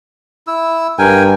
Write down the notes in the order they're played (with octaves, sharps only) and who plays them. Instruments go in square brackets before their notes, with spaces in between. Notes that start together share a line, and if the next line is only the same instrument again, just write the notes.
[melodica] E4 E6
[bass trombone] G2 [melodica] A#4 G5 G#5